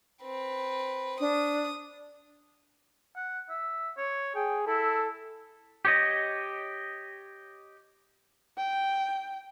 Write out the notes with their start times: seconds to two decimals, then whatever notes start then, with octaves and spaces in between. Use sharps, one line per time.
0.23 C4 B4
1.20 D4 D#6
3.16 F#5
3.49 E5
3.97 C#5
4.35 G#4 G5
4.67 E4 A4
5.85 G4 C#5 D#5
8.57 G5